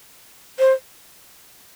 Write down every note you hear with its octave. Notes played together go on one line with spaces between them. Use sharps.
C5